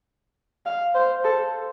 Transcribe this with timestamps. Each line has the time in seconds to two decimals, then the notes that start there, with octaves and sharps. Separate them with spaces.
0.66 F5
0.95 C5
1.24 A4